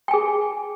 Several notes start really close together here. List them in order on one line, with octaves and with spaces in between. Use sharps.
G5 G#5 G#4